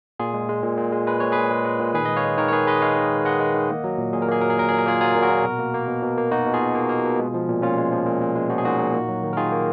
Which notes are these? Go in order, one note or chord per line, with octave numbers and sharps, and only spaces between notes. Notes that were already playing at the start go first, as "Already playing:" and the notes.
A#2 F4 G#4
G#3
G#3
A#2
A#2
G#3
G#3 B4
A#2 C#5
A#2 G#4 B4
G#3
G#3
A#2
D#3 G#4 B4
G#3 D#5
C#5 F5
G#3
D#3 A#4 C#5
C#5
D#3 G#4 B4
G#3 B4 D#5
G#3 C#5 F5
D#3
D#3
G#3 D#5 F#5
G#3
D#3
A#3
F#3
A#2
A#2 G#4
A#4
A#3 G#4
F#3 A#4
G#4
A#2 A#4
A#2 G#4
A#4
A#3 F4 G#4
F#3 F4 G#4
A#2
F#4 A#4
A#2
B2
A#3
A#3
B2
B2
A#3
A#3 D#4 F#4
B2
F4 G#4
B2
A#3
A#3
B2
G#3
F3
A#2
A#2 C#4 F4
G#3
F3
A#2
A#2
G#3
F3 F#4
G#4
A#2 D#4 F#4
A#2
A#3
F#3
D#3
A#4
D#3 F4 G#4
A#3